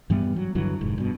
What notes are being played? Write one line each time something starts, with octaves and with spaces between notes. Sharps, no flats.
G2 E3 G3 B3
F#3
G2 D3 E3 F#3
F1 G#2
G2 B2